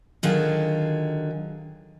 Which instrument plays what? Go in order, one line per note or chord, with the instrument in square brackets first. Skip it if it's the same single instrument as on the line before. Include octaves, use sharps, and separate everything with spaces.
[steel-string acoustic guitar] D3 D#3 F#3 F4 G#4